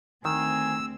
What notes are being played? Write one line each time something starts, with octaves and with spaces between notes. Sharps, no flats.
D2 D#3 C4 G#5 E6